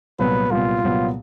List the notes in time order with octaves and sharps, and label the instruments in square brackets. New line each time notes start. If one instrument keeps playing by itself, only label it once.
[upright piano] C2 A#2 F#3 B3 [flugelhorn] B4
[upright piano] C2 A#2 F#3 B3 [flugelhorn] F4
[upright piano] C2 A#2 F#3 B3